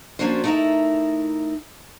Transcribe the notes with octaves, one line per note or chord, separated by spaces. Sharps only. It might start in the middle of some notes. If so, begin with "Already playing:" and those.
F3 A#3 C#4 D4 F#4 C5
A3 B3 D#4 E4 A#4 E5